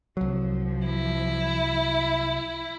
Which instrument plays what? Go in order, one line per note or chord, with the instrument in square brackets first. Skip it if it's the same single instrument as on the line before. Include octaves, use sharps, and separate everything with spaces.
[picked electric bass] C2 F#3 [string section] F3
[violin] E4